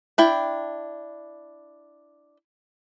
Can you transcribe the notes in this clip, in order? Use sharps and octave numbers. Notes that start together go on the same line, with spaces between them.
D4 E4 G5